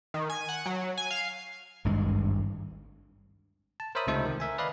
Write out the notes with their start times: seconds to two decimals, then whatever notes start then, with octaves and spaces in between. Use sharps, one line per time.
0.14 D#3
0.30 G#5
0.49 F#5
0.66 F#3
0.97 G#5
1.11 F5
1.85 G#1 D2 G2 G#3
3.80 A5
3.95 A#4 C5 C#5 E5 B5 D#6
4.07 C#2 C3 A3 D#4 A4 C5
4.25 D#3
4.40 A#4 E5 G#5
4.58 B4 D5 D#5 F5 B5